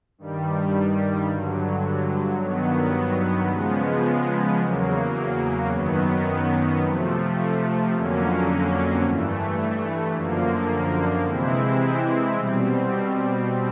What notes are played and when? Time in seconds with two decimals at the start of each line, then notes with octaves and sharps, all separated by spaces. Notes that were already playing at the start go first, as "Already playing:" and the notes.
0.18 G2 D#3 G3
1.29 G2 D3 F#3
2.39 G2 D#3 F#3 B3
3.50 C#3 F3 G#3 B3
4.61 E2 C#3 F#3 A#3
5.71 F#2 D#3 F#3 B3
6.82 C3 F3 A3
7.93 F2 D3 F#3 A#3 C#4
9.03 G2 E3 A3
10.13 F#2 D3 F3 A#3
11.25 C3 E3 G#3 C4 E4
12.35 B2 G3 C4